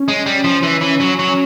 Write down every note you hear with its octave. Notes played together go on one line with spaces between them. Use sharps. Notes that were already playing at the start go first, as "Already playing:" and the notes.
Already playing: C#4
G#3
G3
F3
E3
E3
F#3
F#3